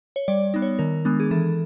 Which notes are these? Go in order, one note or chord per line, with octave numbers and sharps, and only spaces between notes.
C#5
G3 D5
B3 D#4
C#5
D#3 A#4
G#3 B3 D4
G#4
E3 A4